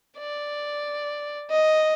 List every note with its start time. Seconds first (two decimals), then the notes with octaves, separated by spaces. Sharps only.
0.18 D5
1.50 D#5